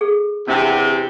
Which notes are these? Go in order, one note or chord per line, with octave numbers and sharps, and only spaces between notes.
G#4 A4
E2 C3 D4 E4